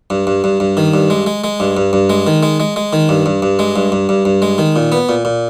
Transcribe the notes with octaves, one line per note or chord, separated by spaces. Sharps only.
G2
G2
G2
G2
D#3
G2
G#3
G#3
G#3
G2
G2
G2
G#3
D#3
G#3
G#3
G#3
D#3
G2
G2
G2
G#3
G2
G2
G2
G2
G#3
D#3
A#2
B3
A#2
A#2